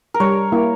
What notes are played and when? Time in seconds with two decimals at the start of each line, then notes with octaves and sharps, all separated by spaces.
0.14 A#4
0.20 G3 C#5
0.52 A#3 E4